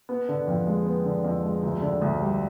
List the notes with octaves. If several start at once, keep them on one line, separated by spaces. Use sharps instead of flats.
B3
D3
F2
G#3
B3
D3
F2
G#3
D2
D3
D2
G3